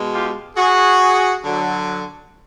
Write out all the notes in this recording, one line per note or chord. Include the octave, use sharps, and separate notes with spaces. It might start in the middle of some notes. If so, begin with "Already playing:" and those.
Already playing: B2 G#3
F4 G4
F#4 G#4
D3 F#3